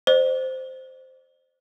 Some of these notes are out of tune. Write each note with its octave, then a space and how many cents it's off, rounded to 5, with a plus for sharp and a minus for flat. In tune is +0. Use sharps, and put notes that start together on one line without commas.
C5 -5 D#5 -45